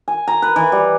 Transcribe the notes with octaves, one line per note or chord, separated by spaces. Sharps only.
G#5
A#5
B4
E3
G3